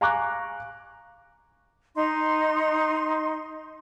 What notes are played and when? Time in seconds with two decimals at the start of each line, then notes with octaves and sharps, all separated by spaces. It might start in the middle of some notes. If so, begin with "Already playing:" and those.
0.01 F5 G#5 A#5 C#6 D6 F#6
1.95 D#4 C6